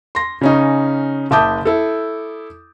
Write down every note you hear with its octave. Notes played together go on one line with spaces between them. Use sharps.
C6 A#6
C#3 C#4 D#4
F#1 E5 A5 D6 D#6 G6
E4 A4